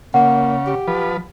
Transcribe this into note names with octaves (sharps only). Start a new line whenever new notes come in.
C#3 A#3 F#5
G4
F3 B4